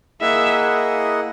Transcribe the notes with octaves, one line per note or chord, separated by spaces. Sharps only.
A#3 E4 G#4 D#5 E5 F#5